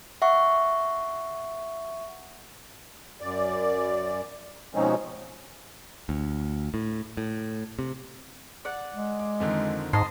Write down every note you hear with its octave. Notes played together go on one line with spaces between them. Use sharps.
E5 F#5 C#6
F#2 D5
B2 F3 G#3 C4 C#4 D#4
D2
A2
A2
C3
D5 F#5
G#3
D6
F2 D3 D#3
G#2 D#5 A5 C6